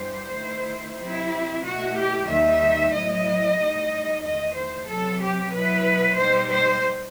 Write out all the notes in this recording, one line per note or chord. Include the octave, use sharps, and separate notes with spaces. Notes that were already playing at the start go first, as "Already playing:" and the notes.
Already playing: G2 E3 G3 B3 C5
D#3 A3 E4
C3 F#3 C4 E4
B2 A3 E4 F#4
G4
D#2 D#3 G3 D#4 E5
A2 F#3 B3 E4 D#5
A2 G3 D#4
E2 D#3 A3 D#5
C5
C3 F#3 B3 A4
G4
B2 F#3 B3 E4 B4
B2 G3 D#4 C5
C5